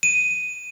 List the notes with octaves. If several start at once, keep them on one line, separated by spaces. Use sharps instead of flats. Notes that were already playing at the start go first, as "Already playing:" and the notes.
D#7